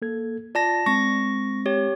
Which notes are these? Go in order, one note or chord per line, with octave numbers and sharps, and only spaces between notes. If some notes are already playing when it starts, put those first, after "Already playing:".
A#3 A4 G#6
F4 D5 A5 A#6
G#3 C4 C#6 A#6
G4 C#5